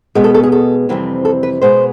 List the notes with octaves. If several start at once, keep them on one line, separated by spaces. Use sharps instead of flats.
B2 G#3 B3
A4
A4
G#4
A4
F2 C3 E3 G3 C4
A4
B4
B2 G#3 B3 C5